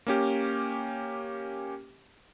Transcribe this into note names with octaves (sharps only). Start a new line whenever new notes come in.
A#3 C#4 G4